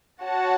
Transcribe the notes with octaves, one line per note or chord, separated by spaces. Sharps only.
F#4 C#5 F#5 A5